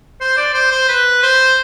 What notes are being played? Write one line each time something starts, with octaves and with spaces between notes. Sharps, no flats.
C5
D5
C5
C5
B4
C5